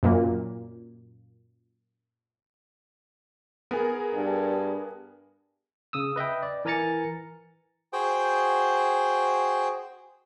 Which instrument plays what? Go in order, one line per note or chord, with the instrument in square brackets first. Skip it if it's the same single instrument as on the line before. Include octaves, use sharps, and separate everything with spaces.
[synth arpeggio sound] F#2 A#2 A#3
[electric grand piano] B3 [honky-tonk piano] G#4 A#4
[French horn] G2
[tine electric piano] C#3 D#6 E6
B4 D#5 E5 G5
D5
E3 A#4 G#5 A#5 A6 C#7
[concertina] F#4 G#4 C5 G5